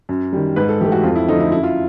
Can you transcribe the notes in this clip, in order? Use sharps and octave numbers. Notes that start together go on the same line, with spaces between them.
F#2
D#3 G3
G#2 B4
A4
E3 A3 G4
F#4
F2 F4
E4
D3 F3 A3 D#4
E4
F#2 E4
F4